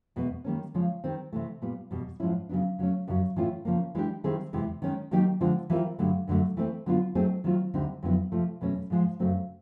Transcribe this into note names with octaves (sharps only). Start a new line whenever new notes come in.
E2 B2 G#3 B3
D#3 G3 A#3 C#4
C#3 F3 G#3 C#4
D#3 G3 C4
C3 E3 A3
A#2 G3 B3
E2 B2 G3
G#2 F3 G#3 C#4 E4
C#3 F#3 B3 D4
C#3 F#3 A3 C#4
F#2 C#3 F#3
A2 E3 A3 C#4 F4
C#3 F3 A#3
E3 G#3 B3 D4 G4
D#3 G3 C4 E4 G#4
E2 C3 E3 G#3
D#3 G#3 C#4
D#3 F#3 A#3 D#4 G4
D3 F3 G#3 C4 F4
E3 G3 C4 F4 A#4
G2 D3 F#3 A3
F#2 D3 F#3 A3
E3 A3 C4
D3 F#3 B3 D4 F4
F#3 A3 C4 D#4 G#4
D#3 F#3 A3 C4 F4
D2 D3 G3 C4 D#4
F2 D3 F#3 B3 E4
C3 F3 A3
E2 B2 F#3 A3 C#4
G#2 F3 G#3
F#2 C#3 F#3 A3 C4